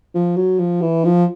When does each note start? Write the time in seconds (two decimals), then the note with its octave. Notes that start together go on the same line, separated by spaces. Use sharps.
0.15 F3
0.37 F#3
0.59 F3
0.82 E3
1.05 F3